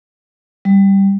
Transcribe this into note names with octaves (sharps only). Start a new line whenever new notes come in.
G3